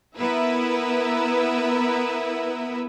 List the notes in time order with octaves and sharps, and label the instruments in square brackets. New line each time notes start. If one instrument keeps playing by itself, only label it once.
[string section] B3 E4 A#4 B4 E5